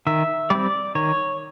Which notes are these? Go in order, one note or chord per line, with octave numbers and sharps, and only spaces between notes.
D#3 E5
G3 C4 D5
D#3 C#5